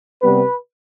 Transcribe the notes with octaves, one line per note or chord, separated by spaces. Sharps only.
C3 G3 B3 B4